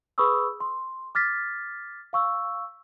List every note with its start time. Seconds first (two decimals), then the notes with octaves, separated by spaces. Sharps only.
0.18 G#4 B4 B5 C#6 D#6 E6
0.60 C6
1.15 D6 F6 A6 B6
2.13 F5 C#6 E6